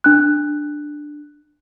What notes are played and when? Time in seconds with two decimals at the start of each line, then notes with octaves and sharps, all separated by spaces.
0.04 D4 F#6